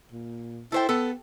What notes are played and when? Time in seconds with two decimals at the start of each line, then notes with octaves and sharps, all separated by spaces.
0.12 A#2
0.72 E4 A4 C5 G5
0.89 B3 A4